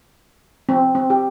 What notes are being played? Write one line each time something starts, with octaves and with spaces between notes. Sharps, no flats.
C4
C4
G4